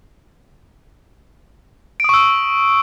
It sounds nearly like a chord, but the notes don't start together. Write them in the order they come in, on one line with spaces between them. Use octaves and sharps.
D7 D#6 C#6 E6